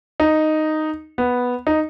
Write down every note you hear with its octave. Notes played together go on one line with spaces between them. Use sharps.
D#4
B3
D#4